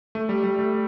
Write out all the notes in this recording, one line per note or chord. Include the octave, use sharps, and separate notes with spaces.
A3
G3
G3
A3